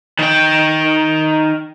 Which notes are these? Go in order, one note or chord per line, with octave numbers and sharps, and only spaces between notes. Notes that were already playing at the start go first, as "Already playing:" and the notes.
D#3 G5